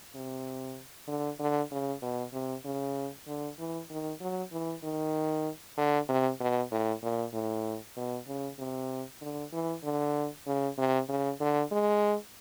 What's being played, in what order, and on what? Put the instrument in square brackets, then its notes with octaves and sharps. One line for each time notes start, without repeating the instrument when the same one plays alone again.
[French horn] C3
D3
D3
C#3
B2
C3
C#3
D3
E3
D#3
F#3
E3
D#3
D3
C3
B2
A2
A#2
A2
B2
C#3
C3
D3
E3
D3
C#3
C3
C#3
D3
G#3